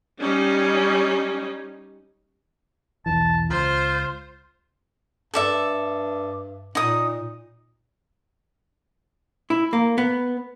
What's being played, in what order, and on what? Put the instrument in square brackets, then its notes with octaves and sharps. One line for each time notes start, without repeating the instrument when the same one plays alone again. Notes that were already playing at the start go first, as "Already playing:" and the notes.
[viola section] G3 C#4 D#4
[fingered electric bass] B1 E2 E3 [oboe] A5
[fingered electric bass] C#2 [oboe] F4 [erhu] C5
[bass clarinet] G2 [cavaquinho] A4 D5 E5
[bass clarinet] A#2 [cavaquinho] D#4 D#6
[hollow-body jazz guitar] E4
A#3
B3